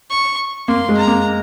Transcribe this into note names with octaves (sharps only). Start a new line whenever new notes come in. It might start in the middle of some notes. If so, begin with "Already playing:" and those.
C#6
A#3 C6
G#3
A#5
A#3